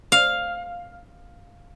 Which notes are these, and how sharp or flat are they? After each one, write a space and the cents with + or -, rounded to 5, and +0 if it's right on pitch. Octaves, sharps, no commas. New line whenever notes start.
F5 +5